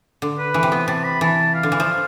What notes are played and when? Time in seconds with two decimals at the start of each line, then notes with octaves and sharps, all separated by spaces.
0.22 D3
0.39 B4
0.54 E3
0.63 C3
0.72 B3
0.88 C3 A5
1.04 B5
1.21 E3 A5
1.55 F5
1.63 D3
1.72 E3
1.80 F3